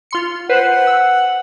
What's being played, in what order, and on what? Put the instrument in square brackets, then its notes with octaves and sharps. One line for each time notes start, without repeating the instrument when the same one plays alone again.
[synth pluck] F4 C6 C#7
[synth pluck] B4 C5 [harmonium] F#5
[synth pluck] E6